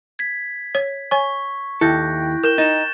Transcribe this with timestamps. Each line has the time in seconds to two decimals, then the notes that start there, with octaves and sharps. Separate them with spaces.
0.19 G#6 B6
0.75 C#5
1.11 C#5 G#5 C#6
1.81 D#2 E4 A4 G5 F#6 G6 A#6
2.44 A#4 G6 E7 G7
2.58 D#4 A6 E7